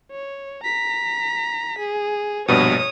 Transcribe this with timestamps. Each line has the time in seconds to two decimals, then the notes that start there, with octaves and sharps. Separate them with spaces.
0.11 C#5
0.63 A#5 B6
1.79 G#4
2.48 A#1 G2 B2 C#5 D#6